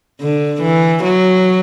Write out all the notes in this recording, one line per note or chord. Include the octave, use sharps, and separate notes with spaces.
D3
E3
F#3